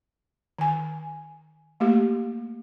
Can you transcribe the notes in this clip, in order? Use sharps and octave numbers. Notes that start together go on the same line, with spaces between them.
D#3 G#5
A3 A#3 G4